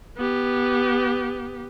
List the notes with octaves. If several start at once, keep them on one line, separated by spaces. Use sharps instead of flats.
B3 G4